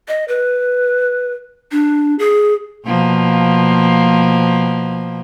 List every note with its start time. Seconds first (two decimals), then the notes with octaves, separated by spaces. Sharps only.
0.08 D#5
0.28 B4
1.72 D4
2.19 G#4
2.86 B2 F3 A#3